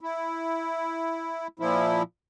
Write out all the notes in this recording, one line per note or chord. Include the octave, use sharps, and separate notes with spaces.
E4
A#2 F3 E4